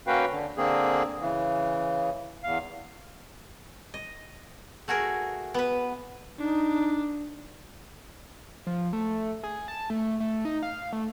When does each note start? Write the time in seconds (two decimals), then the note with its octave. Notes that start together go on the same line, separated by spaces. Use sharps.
0.07 A#3 C#4 F#4 B4 F5 G5
0.30 D3
0.58 D3 A#3 C4 G#4
1.20 C#3 E3
2.44 E2 F5
3.94 D#5
4.88 A3 F#4 G#4 A#4
5.54 B3 B4
6.39 D4 D#4
8.67 F3
8.93 A3
9.43 G#4
9.68 A5
9.90 A3
10.20 A3
10.45 D#4
10.63 F5
10.93 A3